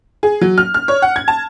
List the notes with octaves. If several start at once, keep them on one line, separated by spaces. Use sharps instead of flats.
G#4
F#3
F6
F6
C#5
F#5
G#6
A5